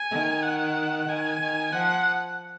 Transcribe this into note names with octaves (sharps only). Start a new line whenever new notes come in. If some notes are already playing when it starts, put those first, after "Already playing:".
Already playing: G#5
D#3
F#5
D#3 G#5
D#3
F3 F#5